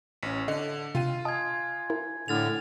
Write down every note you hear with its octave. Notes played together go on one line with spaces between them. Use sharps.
A1 C#4 B6 C#7
D3 D#5
C3 F4 G5 D#7
D#5 G#5 A5 D#6 G#6
E4 A#4
A2 D3 F6 A6 F7